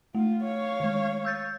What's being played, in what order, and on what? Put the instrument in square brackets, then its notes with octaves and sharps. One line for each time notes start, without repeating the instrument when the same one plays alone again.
[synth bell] A3 [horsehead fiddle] F4
[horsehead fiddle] C#5 F5
[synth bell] D#3 G#3
E6 G6 A6